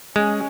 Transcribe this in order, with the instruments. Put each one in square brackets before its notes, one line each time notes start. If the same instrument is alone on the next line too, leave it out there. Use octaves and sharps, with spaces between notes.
[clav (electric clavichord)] G#3 [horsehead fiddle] C#4